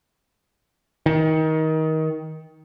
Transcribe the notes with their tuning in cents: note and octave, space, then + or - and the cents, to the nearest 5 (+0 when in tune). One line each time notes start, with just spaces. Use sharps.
D#3 +25